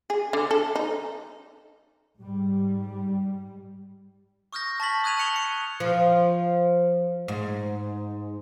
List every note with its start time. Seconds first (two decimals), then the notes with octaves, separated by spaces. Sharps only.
0.10 G#4
0.33 D3
0.51 A4
0.75 D#4
2.18 G#2 G3
4.53 C#6 D#6 F6 G6 A#6
4.80 A5 C#6 A6 B6 F#7
5.04 D#6 F#6 G#6 D#7 F7
5.17 A5 D#6 F#6 C#7 F7 G7
5.36 C#7
5.80 F3
7.28 G#2